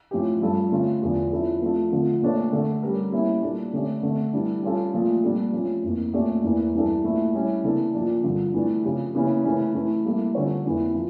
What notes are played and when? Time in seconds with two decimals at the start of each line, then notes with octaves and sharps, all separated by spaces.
0.11 A2 F3 C#4 G4
0.42 G2 F3 C#4 F4 A4
0.72 D3 A3 C#4 F4
1.02 E2 D3 F3
1.32 F3 C#4 E4 A4
1.62 F3 A3 D4 A4
1.91 D3 F3 A3
2.22 A#2 A3 D4 A4 C#5
2.52 D3 A3 D4 A4
2.83 G3 C#4 G4 A#4
3.12 G3 A#3 C#4 E4
3.42 A#2 G3 D4 A4
3.73 D3 A3 C#4 G4 D5
4.03 D3 A3 D4
4.33 E3 G3 D4
4.63 G3 C#4 F4 A4
4.94 A#2 F3 A3
5.23 A#2 G3 D4 A4
5.53 F3 A3 C#4
5.83 F2 E3 A#3
6.13 A#2 A3 C#4 G4 D5
6.43 E2 E3 A#3
6.73 G2 E3 G3 D4 A4
7.04 A#2 A3 E4
7.34 G3 C#4 E4
7.63 C#3 E3 A#3 D4 A4
7.95 A#2 F3 A#3 D4
8.23 G2 D3 F3
8.54 E3 A3 D4
8.84 C#3 F3 C#4 G4
9.15 C#3 E3 A#3 C#4 G4
9.44 C#3 E3 A3 C#4
9.74 E3 A3 E4
10.04 G3 A#3 E4 A4
10.35 D3 G3 C#4 F4 C#5
10.65 F2 E3 A#3
10.95 F3